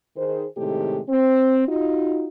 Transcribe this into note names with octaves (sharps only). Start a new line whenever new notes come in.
D#3 G#4 C5
A2 C3 D#3 G#3 A3 G4
C4
D#4 F4 F#4